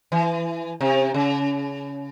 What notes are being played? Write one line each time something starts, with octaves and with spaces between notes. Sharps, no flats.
E3
C3
C#3